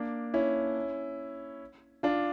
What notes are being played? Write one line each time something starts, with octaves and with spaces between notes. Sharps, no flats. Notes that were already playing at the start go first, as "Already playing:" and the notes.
Already playing: A#3 D4
C#4 E4
D4 F4